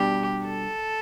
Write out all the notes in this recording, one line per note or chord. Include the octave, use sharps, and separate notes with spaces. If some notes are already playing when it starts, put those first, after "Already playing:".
Already playing: B2 G3 D4 G4
A4